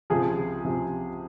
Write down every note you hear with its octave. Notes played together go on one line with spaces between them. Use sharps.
C#2 C3 F3 G#4
C#2 C3 F3